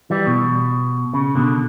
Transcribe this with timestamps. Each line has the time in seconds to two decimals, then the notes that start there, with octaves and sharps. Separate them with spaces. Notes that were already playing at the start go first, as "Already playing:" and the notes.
0.10 E3 G3
0.27 B2
1.14 C#3
1.35 B2 D3